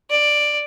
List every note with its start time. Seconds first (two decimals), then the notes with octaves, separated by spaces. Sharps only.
0.10 D5